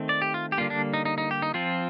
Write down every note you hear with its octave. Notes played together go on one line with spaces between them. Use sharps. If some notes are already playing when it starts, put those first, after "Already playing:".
Already playing: D#3 A3 C4
D5
G4
F4
G4
D3 G3 A#3 F4
D4
D#4
D#4
D#4
G4
D#4
F3 C4 F4